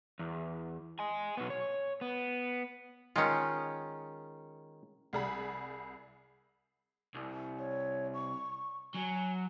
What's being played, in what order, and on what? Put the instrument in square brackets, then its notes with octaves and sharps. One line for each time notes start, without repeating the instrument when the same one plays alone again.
[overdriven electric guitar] E2
D#5 G#5
B1 B3
C#5
B3
[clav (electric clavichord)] D#3 F4 [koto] G#3 C#4
[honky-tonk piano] C2 G3 G#4 F#5 B5
[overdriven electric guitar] C2
[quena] C#5
C#6
[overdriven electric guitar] F#3 [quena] G#5